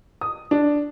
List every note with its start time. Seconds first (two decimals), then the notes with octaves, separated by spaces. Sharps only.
0.21 D#6
0.51 D4